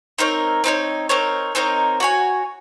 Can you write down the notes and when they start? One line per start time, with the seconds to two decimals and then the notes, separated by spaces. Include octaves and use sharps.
0.18 C4 D#4 A#4 C#5
0.64 C4 D#4 A#4 C#5
1.09 C4 D#4 A#4 C#5
1.55 C4 D#4 A#4 C#5
2.00 F#4 C#5 G#5